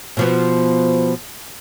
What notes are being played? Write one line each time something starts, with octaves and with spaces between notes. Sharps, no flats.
B2 F3 B3